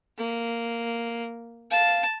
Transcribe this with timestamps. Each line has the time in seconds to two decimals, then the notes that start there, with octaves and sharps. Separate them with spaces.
0.18 A#3
1.71 F5 A5